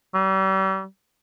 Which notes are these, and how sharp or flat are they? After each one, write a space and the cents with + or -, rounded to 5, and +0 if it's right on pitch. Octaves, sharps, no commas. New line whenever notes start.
G3 -40